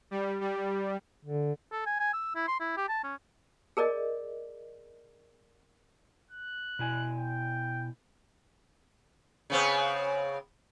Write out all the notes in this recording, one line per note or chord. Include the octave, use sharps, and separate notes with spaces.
G3
G3
D3
A4
G#5
G#5
E6
E4
C6
E4
G4
A5
C#4
G#4 A#4 D5 D#5
F#6
B2 E4 G#5
G5
C#3 B3 C4